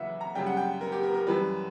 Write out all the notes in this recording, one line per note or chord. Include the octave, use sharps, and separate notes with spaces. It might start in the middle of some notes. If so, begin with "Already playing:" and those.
Already playing: E2 C#3 F#3 B4 E5 F#5
A#5
F#2 C#3 G3 G5
F#5
G5
A#4
G4
A#4
A#4
F#2 E3 G3 B4